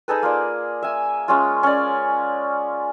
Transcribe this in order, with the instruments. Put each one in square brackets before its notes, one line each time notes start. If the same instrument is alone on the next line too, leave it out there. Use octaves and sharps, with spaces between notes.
[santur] D#4 G#4 A4 B4
A#3 F4 D5
E5 G#5
G#3 C#4 F4
C#4 D5